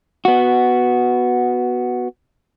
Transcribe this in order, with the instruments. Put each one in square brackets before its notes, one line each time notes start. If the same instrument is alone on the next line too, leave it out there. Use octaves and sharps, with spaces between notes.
[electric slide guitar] B3 F#4